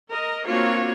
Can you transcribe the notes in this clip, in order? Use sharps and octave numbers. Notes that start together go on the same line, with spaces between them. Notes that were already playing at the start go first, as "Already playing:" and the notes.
A#4 D#5
A#3 C4 D4 F4 F#4 C#5